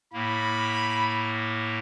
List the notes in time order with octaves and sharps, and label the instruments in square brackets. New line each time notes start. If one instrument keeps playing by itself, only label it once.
[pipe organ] A2 A#3 [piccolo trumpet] B5